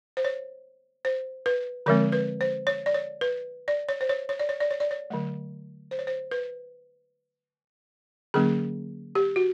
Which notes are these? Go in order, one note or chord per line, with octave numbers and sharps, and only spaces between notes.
C5
C#5
C5
B4
D3 F3 G#3 C4 A#4
B4
C5
C#5
D5
C#5
B4
D5
C#5
C5
C#5
C#5
D5
C#5
D5
C#5
D5
C#5
D3 F#3 A3
C5
C#5
C5
B4
D3 F#3 A#3 C#4 G#4
G4
F#4